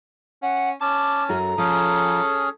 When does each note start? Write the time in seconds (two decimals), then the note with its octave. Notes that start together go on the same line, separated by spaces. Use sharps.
0.43 C#4 F#5
0.81 C#4 A5 D6
1.29 F#2 F#4 A4 A#5
1.58 F3 C#4 G#4 A4